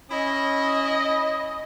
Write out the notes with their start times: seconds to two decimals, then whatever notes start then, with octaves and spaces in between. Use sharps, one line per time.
0.11 C#4 E4 D#5